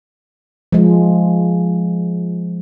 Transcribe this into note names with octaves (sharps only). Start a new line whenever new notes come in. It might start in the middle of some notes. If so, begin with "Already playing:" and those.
F3 G#3